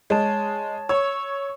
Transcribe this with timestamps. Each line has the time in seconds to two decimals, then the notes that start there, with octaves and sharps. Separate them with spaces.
0.10 G#3 C#5 A5
0.89 C#5 C#6 E6